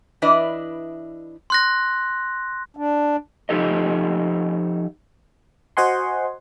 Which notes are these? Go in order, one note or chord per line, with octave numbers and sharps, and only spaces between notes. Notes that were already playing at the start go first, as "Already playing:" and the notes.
E3 D4 E4 B4 D5 D#5
C6 F#6 A#6
D4
F3 D#4 G4 A4 D#5
F#4 C5 D#5 F#5 G#5 C6